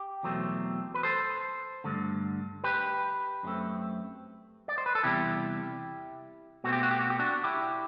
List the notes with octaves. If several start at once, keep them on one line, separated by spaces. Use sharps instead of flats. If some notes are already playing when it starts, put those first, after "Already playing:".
Already playing: G4
E2 B2 F#3 A3 C4
B4
A4 C5
G2 D3 A3
G4 B4
F#2 F#3 A3 C4
D5
C5
B4
A4
E2 C3 G3 E4 G4
B2 A3 C4 F#4
G4
F#4
G4
F#4
G4
D4 F#4
E4 G4